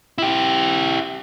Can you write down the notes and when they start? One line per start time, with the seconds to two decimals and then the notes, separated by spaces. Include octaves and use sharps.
0.18 E4 G4